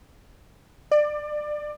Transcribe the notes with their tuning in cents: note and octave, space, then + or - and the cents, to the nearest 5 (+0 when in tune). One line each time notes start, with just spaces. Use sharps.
D5 +25